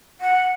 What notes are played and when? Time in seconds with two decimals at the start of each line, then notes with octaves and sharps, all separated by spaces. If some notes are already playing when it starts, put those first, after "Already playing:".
0.21 F#5